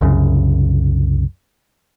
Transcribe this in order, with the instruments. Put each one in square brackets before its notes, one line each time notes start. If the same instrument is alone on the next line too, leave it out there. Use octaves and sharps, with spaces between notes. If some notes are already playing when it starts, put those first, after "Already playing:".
[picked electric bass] C2 F#2 C#3